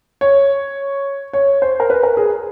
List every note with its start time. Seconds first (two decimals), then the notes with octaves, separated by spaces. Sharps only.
0.21 C#5
1.33 C#5
1.62 C5
1.80 A#4
1.90 B4
2.03 A#4
2.17 G#4